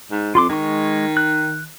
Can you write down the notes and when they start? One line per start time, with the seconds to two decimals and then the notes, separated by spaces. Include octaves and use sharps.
0.11 G#2
0.35 F2 F4 C6 D6
0.49 D#3 G#3 C#6
1.17 F#6